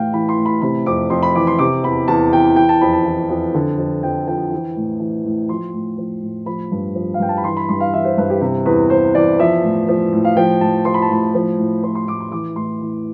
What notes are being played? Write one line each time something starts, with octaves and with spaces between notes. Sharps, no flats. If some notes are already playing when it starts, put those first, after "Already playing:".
Already playing: A2 E3 F5 G5
E3 B5
C6
A2
B5
C3 B5
F2 D6
F2 C6
B5
E3 D6
C6
C3 D6
E2 B5
E2 A5
E3 G5
E3 G5
A5
F2 B5
A5
E3
F2
D3
F2
F2 G5
F3 G5
E3
A2
E3
A2
F3 C6
A2
F3
A2
F3 B5
G2
F3
F5
G2 G5
A5
B5
E3 C6
B5
G2 C6
F5
E3 E5
C5
G2 B4
G4
C3
E2 B4
E2 C5
E3 D5
F3 E5
A2
F3
A2
F5
F3 G5
A2 A5
F3 C6
B5
A5
A2 B5
F3
A2
F3 C6
C6
A2 D6
C6
E3 D6
A2 C6
E3